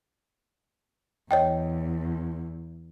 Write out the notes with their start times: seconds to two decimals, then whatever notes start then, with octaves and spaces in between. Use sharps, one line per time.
1.31 E2 C#5 D#5 G5